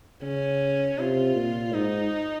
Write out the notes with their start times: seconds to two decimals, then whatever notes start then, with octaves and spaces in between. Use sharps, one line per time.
0.22 C#3 C#4
0.98 C3 F4
1.36 A#2
1.73 G#2 D#4